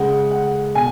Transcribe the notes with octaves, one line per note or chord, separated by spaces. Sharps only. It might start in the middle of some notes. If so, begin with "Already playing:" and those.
Already playing: C#3 G#3 F#5
F#5
B2 G#5